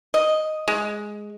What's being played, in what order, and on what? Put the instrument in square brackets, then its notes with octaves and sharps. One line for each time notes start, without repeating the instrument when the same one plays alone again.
[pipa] D#5
G#3